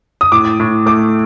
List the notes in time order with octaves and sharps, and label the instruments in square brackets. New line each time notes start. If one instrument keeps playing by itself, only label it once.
[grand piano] D#6
A2 D6
A2
A3 D6